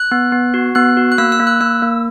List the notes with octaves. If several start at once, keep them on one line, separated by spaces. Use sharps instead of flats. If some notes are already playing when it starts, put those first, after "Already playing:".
Already playing: F#6
B3
B3
F#4
B3 F#6
F#4
F#6
A#3 E6
E6
A#3
F#6
A#3 E6
A#3